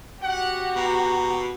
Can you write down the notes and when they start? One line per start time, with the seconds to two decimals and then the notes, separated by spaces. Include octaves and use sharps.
0.23 F#4 G4 F#5
0.76 B2 A#5